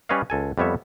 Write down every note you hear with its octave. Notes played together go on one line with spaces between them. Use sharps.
G3 C#4 B4 C#5 D#5 F5
C#2 A4 G#5
F2 G3 B3 C#5 E5